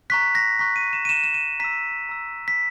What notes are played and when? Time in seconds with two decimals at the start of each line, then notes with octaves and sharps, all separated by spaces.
0.10 A#5 C#6 F#6 B6
0.35 A#6
0.59 A#5 C#6 F#6 B6
0.76 D#7
0.93 E7
1.05 D#7
1.09 A#5 C#6 F#6 E7
1.24 E7
1.34 D#7
1.60 A#5 E6 B6
2.09 A#5 E6
2.48 B6